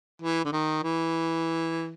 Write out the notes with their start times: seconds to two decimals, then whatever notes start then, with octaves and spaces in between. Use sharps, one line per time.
0.22 E3
0.45 D3
0.52 D#3
0.83 E3